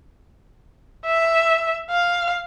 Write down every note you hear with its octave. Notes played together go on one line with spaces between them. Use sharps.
E5
F5